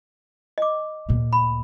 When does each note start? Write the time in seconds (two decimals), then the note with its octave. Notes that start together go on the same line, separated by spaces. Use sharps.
0.58 D#5 D6
1.09 D2 A#2
1.33 B5